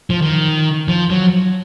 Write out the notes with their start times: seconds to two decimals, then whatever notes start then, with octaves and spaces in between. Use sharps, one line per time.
0.10 F3
0.22 D#3
0.88 F3
1.10 F#3